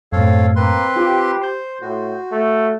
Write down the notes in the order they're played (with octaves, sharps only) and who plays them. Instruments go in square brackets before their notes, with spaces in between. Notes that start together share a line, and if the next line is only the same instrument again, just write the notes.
[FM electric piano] F#2 A2 [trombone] C4 [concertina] A4 C#5 F5
[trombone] A#3 [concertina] C4 B4 C6
[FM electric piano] F4 [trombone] G4
[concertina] C5 [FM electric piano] C6 G6
[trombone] A2 [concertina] F#4
[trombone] A3